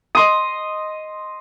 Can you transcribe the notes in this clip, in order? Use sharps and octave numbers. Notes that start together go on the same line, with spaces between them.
D#5 C6 D#6